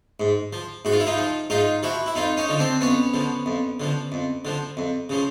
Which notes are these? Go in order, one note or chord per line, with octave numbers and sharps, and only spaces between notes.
G#2
F3
G#2 F#4
F4
E4
D#4 F4
F3
G#2 D#4 F4
F3 E4 F#4
E4
F2 D#4 F4
C#4 D#4
D3 F3
C4 D4
F2 B3 C#4
D3 F3
F2
D3 F3
F2
D3 F3
F2
C#3 F3